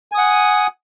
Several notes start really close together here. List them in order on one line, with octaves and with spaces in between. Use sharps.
G#5 D#6 F#5